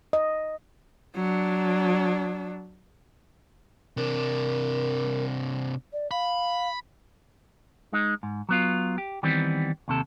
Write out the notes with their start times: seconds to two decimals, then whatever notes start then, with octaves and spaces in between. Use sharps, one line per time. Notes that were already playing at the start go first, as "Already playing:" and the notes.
0.13 D#5
1.16 F#3 D4
3.97 C3 D4 A#4
5.93 D5
6.11 F5 B5
7.93 G#3 D#4
8.23 G#2
8.49 F#3 B3 F4
8.98 G4
9.23 D#3 E3 G3 B3 C4
9.88 D#2 C3 A4